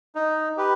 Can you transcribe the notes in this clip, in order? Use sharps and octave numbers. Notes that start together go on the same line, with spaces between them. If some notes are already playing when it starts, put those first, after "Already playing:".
D#4
G4 B4